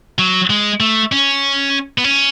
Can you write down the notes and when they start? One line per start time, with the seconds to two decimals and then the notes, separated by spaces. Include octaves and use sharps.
0.19 F#3
0.50 G#3
0.80 A3
1.12 C#4
1.98 B3
2.04 C#4